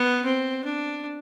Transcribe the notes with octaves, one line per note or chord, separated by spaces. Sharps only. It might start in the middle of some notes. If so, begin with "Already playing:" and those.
Already playing: B3
C4
D4